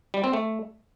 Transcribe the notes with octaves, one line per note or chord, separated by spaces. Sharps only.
G3
C4
A3